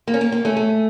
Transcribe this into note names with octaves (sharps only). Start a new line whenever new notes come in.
A#3
C#4
A#3
A#3
A3 C#4
A3